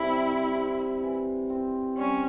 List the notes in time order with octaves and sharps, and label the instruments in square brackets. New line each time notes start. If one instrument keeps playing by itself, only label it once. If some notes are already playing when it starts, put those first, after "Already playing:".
Already playing: [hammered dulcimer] C3 G3 [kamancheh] E4
[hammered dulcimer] C4
C3
E3
C4
[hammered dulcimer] G3 [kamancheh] C#4